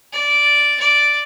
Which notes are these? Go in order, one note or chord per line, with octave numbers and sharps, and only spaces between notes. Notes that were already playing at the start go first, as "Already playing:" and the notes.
D5
D5